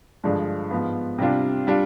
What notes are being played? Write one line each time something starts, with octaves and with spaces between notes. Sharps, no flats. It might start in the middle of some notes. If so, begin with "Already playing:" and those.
G2 D3 F3 G#3 D4
G#2 F3 B3
C3 G3 D4 F4
G3 D4 F4